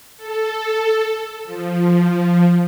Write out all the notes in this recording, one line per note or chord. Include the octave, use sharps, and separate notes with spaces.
A4
F3